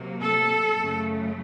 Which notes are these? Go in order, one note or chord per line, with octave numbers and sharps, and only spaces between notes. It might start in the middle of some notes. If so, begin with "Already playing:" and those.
Already playing: C3 F#3 A#3
A4
F#2 C#3 A3